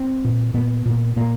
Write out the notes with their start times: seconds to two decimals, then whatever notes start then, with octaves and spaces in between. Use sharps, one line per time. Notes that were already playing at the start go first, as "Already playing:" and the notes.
Already playing: C4
0.25 A#2
0.54 A#2 B3
0.86 A#2
1.16 A#2 A#3